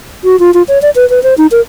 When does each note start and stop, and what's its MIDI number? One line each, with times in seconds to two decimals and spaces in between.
0.24 0.39 66
0.40 0.53 65
0.54 0.63 65
0.68 0.81 73
0.82 0.90 74
0.95 1.08 71
1.10 1.22 71
1.23 1.34 72
1.38 1.47 63
1.51 1.61 70